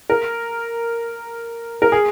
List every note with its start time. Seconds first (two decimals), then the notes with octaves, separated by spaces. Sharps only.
0.10 A#4
1.82 A#4
1.92 G#4